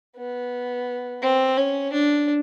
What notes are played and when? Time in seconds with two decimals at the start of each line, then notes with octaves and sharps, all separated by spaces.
0.17 B3
1.22 C4
1.58 C#4
1.92 D4